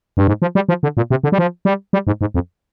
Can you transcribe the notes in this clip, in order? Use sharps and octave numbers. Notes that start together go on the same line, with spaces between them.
G2
G#2
F3
G3
F3
D3
A#2
C3
D3
G3
F3
G3
G3
G#2
G#2
F2